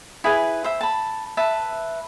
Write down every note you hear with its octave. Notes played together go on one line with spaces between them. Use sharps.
E4 G#4 B4 G#5
C5 E5
A5 B5
B4 E5 A5